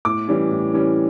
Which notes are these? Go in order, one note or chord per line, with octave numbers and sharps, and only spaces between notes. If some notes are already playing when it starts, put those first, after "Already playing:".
A2 D6
E3 G3 C#4
A2
E3 G3 C#4